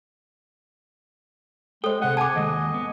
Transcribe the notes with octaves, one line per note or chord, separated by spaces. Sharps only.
G#3 A4 C5 G5
C3 G#4 F#5
G#5 A5 D6
D#2 G#3 D#5
B3